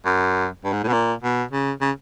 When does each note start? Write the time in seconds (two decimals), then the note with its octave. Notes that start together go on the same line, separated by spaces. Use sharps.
0.06 F#2
0.64 G2
0.73 G#2
0.84 A2
0.88 B2
0.93 A#2
1.23 B2
1.51 C#3
1.81 C#3